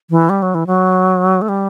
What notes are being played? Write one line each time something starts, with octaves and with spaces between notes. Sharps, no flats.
E3
G3
F#3
E3
F#3
A3
G3